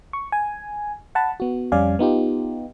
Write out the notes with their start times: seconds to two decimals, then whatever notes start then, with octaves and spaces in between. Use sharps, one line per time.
0.13 C#6
0.32 G#5
1.15 F#5 A5 B5
1.40 B3 F#4
1.72 F2 G3 C#4 D5 F5 G#5
1.99 B3 D#4 F4 G4